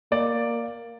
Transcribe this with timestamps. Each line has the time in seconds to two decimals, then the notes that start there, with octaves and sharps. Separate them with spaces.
0.12 A#3 D5